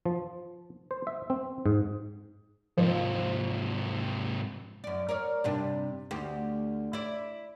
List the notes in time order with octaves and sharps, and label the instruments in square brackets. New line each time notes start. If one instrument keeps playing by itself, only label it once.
[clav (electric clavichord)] F3
C5
E5
C4
G#2
[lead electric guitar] G#2 C3 [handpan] F3
[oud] F#2 D5
A#4 C#5 D5
G2 C3 D4
D2 G4
E4 D5